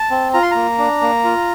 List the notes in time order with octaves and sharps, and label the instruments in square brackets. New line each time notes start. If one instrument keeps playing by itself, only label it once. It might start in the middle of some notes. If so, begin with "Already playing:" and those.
Already playing: [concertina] A5
C4
F4 A#5
C6
A#3 A#5
D4
A#3
F4